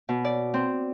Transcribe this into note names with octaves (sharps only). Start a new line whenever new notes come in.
B2
D5
C4